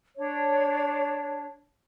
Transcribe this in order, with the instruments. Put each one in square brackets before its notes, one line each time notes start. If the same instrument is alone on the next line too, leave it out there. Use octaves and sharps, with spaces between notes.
[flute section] D4 C#5